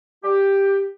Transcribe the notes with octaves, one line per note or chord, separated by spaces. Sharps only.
G4